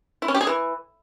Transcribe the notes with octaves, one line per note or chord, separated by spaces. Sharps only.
E4
C#4
G4
G#4
E3